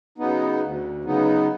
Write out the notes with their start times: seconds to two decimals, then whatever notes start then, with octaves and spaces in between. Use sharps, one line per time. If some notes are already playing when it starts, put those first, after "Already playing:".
0.18 C#3 F#3 B3 D#4
0.62 D2
1.05 C#3 F#3 B3 D#4